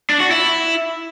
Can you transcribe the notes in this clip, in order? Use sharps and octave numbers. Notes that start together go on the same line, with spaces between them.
D4
F#4
E4